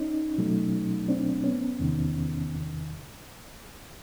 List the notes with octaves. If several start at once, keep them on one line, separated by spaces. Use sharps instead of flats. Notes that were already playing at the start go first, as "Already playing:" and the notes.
Already playing: C#4 D#4
B2 F#3 A3
C4 D4
B3 C#4
E2 C3 D#3